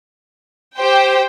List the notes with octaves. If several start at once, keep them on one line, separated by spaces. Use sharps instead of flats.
G4 C5 G5